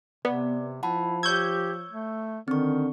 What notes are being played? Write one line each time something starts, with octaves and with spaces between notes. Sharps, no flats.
C3 B3 D5
F3 E4 F#5 A5 B5
G4 C#5 C#6 E6 G6 G#6
A3
D3 D#3 C4 C#6